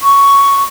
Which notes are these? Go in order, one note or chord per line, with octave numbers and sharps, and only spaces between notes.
C#6